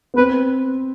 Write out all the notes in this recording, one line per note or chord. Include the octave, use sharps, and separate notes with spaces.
B3
C4 B4